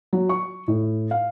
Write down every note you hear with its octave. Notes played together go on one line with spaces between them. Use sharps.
F#3
C#6
A2
F5